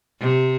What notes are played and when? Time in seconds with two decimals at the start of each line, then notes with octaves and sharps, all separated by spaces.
0.20 C3